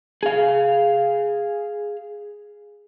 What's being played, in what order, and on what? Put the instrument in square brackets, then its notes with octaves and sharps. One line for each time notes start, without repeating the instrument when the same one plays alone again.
[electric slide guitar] G#4 F5